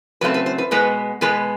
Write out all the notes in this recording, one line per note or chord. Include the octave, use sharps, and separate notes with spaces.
C#3 F#3 A3 C4 B4
B4
C5
B4
B2 G#3 B3 B4
B2 G#3 B3 B4